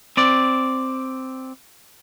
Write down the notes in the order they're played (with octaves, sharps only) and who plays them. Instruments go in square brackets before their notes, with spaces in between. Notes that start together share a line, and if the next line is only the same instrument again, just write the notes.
[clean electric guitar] C4 D5